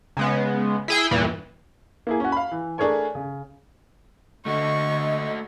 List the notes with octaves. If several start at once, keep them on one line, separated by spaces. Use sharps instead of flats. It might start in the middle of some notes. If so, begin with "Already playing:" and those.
C#3 G#3 B3
E4 G#4 G5
E2 G2 A#2 E3
A#3 E4 G#4
C#4 F#4
F5 B5
E3
A3 D4 G#4 A#4 C#5 G#5
C#3
D3 A3 F#4 D#5 C#6